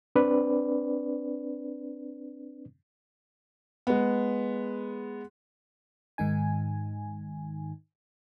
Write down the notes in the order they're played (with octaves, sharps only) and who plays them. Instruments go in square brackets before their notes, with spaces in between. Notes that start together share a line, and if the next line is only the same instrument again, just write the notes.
[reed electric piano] C4 D4 B4 D5
[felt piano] G#3 B3
[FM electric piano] G#2 D#3 D#4 G#5